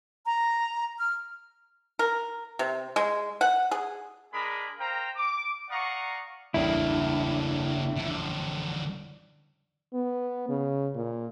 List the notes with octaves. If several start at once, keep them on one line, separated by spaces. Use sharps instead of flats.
A#5
F6
A#4
C3
G#3
F#5
G#4
G#3 D4 G#4 A#4 B5 D#6
A#4 C5 F5 G5 A#5
D6
D5 F5 F#5 A#5 C#6 D#6
A1 E2 G2 C#3 A#3 D4 E4
D3 F3
B3
C#3
A#2